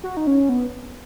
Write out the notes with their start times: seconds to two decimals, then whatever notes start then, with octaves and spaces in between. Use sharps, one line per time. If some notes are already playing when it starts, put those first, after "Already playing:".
0.04 F#4
0.17 D#4
0.27 C#4
0.49 B3